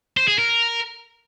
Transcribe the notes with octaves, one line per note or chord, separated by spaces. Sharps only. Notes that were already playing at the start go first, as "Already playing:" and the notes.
C5
G#4
A#4